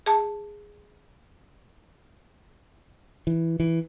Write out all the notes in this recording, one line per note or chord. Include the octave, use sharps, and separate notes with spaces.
G#4 A5
E3
E3